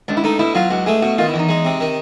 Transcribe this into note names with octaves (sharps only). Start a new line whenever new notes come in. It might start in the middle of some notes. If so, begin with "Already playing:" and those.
C#2 D4
E4
A3 D#4
B2 E4
F#3 F4
C#2 F#4
A3 G#4
B2 F#4
D#3 F4
E4
E2
D#4
G#3
C3
D#3